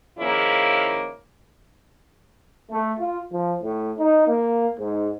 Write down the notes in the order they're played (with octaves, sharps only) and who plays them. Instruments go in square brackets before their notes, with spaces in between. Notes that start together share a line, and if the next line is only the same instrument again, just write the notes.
[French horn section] D#3 F3 A#3 C#4 E4 G#4
[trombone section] A3
F4
F3
A2
D#4
A#3
G#2